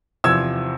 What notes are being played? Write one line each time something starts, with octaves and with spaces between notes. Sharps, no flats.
E2 C3 F3 E6 G#6